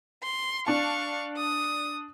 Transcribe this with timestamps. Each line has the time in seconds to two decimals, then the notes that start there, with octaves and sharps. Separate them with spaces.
0.23 C6
0.67 D4 F5 A5 C#6
1.37 D#6